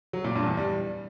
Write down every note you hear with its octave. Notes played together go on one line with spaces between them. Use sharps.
F#3
A#2
G2
E2
G3